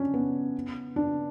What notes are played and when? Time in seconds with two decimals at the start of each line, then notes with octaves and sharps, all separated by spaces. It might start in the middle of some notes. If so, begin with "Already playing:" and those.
Already playing: C#4 D4
0.14 B3
0.96 D4